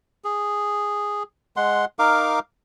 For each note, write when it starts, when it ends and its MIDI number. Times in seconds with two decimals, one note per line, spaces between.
0.24 1.23 68
1.56 1.85 56
1.56 1.85 78
1.56 1.85 84
1.99 2.39 63
1.99 2.39 70
1.99 2.39 77
1.99 2.39 86